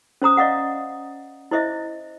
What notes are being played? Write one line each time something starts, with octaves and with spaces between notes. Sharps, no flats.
C#4 C5 A#5 D#6
D5 D#5 F5 F#5
E4 C5 D#5 E5